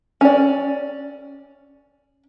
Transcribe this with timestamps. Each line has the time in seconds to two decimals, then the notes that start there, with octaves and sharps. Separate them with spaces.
0.21 C#4 D5